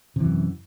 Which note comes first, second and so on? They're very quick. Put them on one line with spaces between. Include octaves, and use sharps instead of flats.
C3 E3 F#2